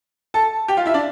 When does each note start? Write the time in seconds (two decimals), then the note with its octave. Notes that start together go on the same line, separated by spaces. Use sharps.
0.34 A4 A5
0.68 G4 G5
0.77 F4 F5
0.86 E4 E5
0.94 D4 D5